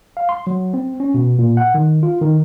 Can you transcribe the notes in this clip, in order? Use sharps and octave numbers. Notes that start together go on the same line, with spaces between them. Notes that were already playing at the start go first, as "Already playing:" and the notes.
F5
C6
F#3
C4
C#4
B2
A#2
F#5
D#3
F4
D#3